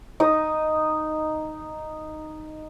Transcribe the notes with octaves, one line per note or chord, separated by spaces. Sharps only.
D#4 D#6